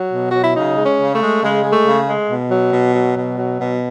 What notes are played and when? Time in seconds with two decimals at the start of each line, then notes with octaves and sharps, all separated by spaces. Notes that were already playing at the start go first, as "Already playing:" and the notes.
Already playing: F#3
0.13 B2
0.30 F#3 F#4
0.44 E4
0.56 C#3 D#4
0.78 G#3
0.86 C#4
0.99 C#3
1.14 A3
1.21 G#3
1.43 C#3 G#3
1.64 G#3
1.72 A3
1.86 C#3
2.08 G#3
2.30 B2
2.51 F#3
2.72 B2
2.95 F#3
3.16 B2
3.38 F#3
3.60 B2